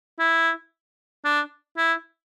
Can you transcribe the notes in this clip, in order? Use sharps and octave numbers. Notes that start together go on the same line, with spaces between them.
E4
D4
E4